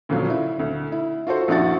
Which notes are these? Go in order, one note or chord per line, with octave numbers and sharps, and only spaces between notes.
D2 A#2 C#3 F3 F#3
E4
D2
E4
F4 F#4 A4 C5
A#1 F#2 D4 E4 F#4 A6